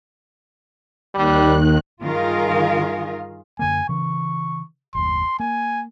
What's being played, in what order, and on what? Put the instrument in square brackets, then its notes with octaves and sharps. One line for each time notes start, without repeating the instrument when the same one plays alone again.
[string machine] D#2 D#3 F#6 [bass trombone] G3
[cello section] G2 D#3 F4 G#4 A#4 F5
[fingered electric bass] F#2 D3 A#3 [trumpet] G#5
[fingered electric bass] C#3 E3 [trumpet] C#6
[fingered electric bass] F#1 D#2 [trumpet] C6
[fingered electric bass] A#3 [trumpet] G#5